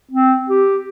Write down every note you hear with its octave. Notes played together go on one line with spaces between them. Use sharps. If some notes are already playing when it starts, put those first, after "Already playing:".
C4
G4